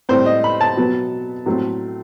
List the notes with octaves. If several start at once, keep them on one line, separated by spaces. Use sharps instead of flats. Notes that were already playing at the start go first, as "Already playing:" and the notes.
A2 G3 C4 C5
D#5
B5
A5
B2 F#3 B3
A2 F#3 A3 C4